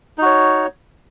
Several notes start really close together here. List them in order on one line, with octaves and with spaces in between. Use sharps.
D#4 F#4 C#5